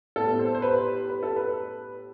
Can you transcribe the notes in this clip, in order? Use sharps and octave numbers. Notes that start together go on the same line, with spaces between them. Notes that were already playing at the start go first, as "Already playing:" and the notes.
A2 G3 B3 A4
C5
C5
B4
B4
A4
B4